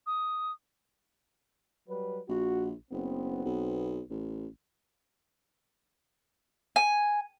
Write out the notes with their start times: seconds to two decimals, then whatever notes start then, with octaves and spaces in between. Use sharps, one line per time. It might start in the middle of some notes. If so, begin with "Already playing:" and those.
0.07 D#6
1.88 F#3 G3 B4
2.29 A#1 F#4
2.91 F#1 B3 C4
3.45 B1
4.10 A1
6.76 G#5